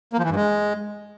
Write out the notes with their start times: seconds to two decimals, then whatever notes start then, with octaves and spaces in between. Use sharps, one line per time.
0.13 A#3
0.19 F3
0.24 E3
0.30 G2
0.36 G#3